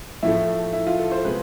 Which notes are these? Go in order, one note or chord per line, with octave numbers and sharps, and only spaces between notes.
A2 F3 A3 E4
E4
F4
A4
C5
C3 G#3 B3 B4